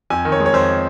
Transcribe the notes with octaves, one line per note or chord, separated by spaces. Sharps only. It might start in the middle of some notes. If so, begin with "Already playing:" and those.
F2 G#5
D#3
C#5
G#3
C#5
F2 C5